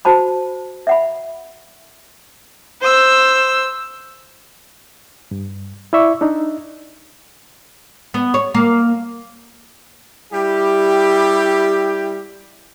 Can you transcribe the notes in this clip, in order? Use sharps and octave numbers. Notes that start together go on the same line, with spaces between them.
F#4 C5 A5 B5
E5 F#5 B5
C5 E6
G2
E4 D5 E5 C#6
D4 D#4
B3
C#5
A#3
G3 E4 G4